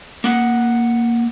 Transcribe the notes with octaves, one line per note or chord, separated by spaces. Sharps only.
A#3 F#5